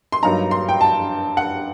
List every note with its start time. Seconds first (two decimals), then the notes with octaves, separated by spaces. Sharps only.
0.12 C6
0.23 G2 F#3 A#3 D#4 A#5
0.51 C6
0.69 G5
0.81 A5
1.37 F#5